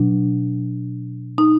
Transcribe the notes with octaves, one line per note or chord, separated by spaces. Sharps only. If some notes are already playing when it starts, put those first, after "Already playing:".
Already playing: B2 F#3 D4
D#4